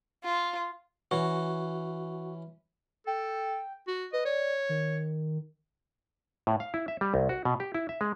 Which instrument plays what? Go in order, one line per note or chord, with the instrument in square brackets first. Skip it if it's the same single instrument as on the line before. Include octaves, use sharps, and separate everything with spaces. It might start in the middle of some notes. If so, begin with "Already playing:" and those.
[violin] F4
[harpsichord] E3 C#4 [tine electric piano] F#4
[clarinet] A4 [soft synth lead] G5
[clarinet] F#4
[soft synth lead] B4 [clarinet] D#5
[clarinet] C#5 [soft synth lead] D5
[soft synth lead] D#3
[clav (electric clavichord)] A2
F5
E4
E5
G3
C2
F#4
B2
G4
E4
E5
G#3